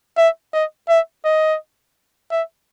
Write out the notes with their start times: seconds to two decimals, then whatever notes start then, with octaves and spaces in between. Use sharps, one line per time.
0.18 E5
0.54 D#5
0.89 E5
1.24 D#5
2.31 E5